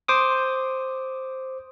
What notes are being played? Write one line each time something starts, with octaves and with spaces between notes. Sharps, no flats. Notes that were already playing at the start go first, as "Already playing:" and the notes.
C5 D6 D#6